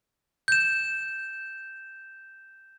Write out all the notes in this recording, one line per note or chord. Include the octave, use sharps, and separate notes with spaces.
G6 E7